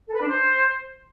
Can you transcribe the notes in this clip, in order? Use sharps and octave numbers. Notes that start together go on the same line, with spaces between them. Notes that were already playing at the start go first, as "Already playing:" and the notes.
A4
B4
D4
C5